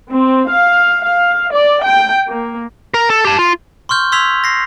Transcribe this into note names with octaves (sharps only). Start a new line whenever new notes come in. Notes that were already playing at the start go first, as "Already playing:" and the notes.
C4
F5
F5
D5
G5
A#3
A#4
A4
G4 A5
F4
C6 C#6 F6 G6
C6 E6 G#6 B6 F7
A#6 C7